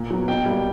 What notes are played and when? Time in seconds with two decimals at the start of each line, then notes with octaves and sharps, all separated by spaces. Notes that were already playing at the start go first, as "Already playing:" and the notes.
Already playing: A#2
0.10 F#3 B3
0.28 B2 G5
0.46 G3 A#3